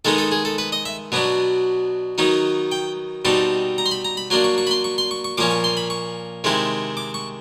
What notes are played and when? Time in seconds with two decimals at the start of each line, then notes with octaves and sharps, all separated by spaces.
0.05 D#3 G#3 B3 D#4 A4
0.18 A4
0.32 G#4
0.45 A4
0.58 B4
0.72 D#5
0.85 E5
1.12 B2 F#3 B3 D4
2.18 D#3 F#3 B3 D#4
2.72 G5
3.25 B2 G3 C4 D#4 A5
3.78 A#5
3.86 C6
3.91 B5
4.05 A#5
4.17 B5
4.30 F#3 A#3 D4 C6
4.44 C#6
4.58 C#6
4.67 B5
4.71 C6
4.84 C#6
4.98 C6
5.11 C#6
5.24 C#6
5.37 A#2 F3 A#3 C#4 D6
5.51 C#6
5.64 C6
5.77 B5
5.90 C#6
6.44 C3 D#3 G#3 C4 E4
6.97 D6
7.14 C#6